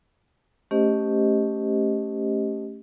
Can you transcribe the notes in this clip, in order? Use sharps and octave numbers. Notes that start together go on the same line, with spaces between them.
A3 C#4 G4 C5 D#5